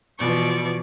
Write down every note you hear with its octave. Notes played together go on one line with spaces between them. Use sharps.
B2 E3 F3 D5 C#6